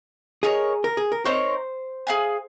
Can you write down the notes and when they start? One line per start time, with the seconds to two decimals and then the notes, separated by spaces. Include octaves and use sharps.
0.43 D#4 G#4 A#4 C#5
0.84 A#4
0.97 G#4
1.12 A#4
1.25 C4 D#4 A#4 C5 C#5
2.07 G#4 C#5 F5 G#5